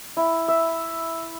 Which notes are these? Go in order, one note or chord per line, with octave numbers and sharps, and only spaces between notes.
E4
E5